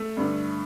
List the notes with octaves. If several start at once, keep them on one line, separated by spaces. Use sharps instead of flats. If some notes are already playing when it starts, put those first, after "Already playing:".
Already playing: A3
G2 D3